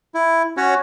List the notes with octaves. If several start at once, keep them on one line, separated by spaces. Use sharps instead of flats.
E4
C#4 F#4 C#5